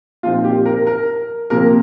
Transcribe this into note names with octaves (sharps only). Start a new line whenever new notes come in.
A#2 F3 C4 D#4 F4
G4
A#4
A#4
C3 F3 A#3 A#4